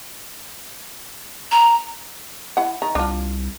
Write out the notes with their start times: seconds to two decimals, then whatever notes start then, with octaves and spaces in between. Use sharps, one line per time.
1.51 A#5
2.57 E4 F#5
2.82 D#3 A#5
2.95 C2 D4 F4